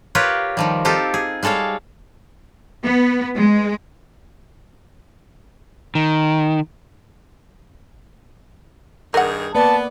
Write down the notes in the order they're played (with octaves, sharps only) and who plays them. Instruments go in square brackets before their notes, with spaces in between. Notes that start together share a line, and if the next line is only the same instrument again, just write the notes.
[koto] F4 G4 A#4 B4 C#5
D#3 F3 G3
C4 D#4 F4 G4 A4
G#4
G3 G#3 A4 C#5 F5
[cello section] B3
G#3
[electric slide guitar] D#3
[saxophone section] G2 D#3 G#4 [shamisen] A#4 F#5
[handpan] A#3 B4 D5 [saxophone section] B3 [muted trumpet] A5